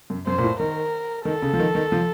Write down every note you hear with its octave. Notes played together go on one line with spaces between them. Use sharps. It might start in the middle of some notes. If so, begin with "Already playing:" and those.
F#2
F#2 C5
A#2
A2
D#3 A#4
D#3 A4
C#3
F3
D#3
D#3
F3